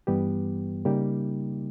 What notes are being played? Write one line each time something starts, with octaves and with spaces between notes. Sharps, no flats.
G2 E3 G3 B3 G4
C#3 G3 A#3 D#4 G4